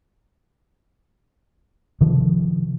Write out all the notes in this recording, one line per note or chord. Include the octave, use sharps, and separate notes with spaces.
C3 D#3 F3